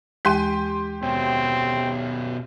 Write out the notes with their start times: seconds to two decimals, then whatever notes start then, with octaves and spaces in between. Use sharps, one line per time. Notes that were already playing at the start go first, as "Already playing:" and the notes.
0.25 D#2 E3 G#3 G4 C6 D#7
1.03 B2 C4 C#4